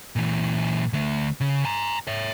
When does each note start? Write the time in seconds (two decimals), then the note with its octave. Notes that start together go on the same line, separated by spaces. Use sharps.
0.16 A#2 E3
0.93 D3 A3
1.41 C#3
1.65 G#5 A#5
2.07 C#5 E5